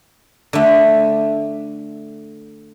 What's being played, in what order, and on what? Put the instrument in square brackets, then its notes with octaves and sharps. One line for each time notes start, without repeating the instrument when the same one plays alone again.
[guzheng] D3 A3